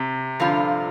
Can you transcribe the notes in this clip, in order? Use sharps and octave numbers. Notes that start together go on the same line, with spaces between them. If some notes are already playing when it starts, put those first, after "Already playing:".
Already playing: C3
G2 D3 F3 F4